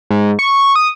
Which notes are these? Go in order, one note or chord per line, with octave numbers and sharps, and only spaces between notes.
G#2
C#6
D#6